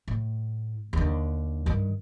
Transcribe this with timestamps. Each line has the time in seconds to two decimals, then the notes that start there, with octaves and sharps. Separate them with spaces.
0.08 A2
0.93 D#2 D3
1.66 G2 D#3